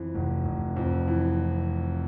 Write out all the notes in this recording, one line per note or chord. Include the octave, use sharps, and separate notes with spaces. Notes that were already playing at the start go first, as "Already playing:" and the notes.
Already playing: F2 E3
F1
F1
F2
E3